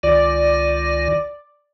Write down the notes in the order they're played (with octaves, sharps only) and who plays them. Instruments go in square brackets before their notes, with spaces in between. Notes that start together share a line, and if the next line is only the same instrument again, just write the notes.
[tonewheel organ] C#2 D#3 F4 [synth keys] D5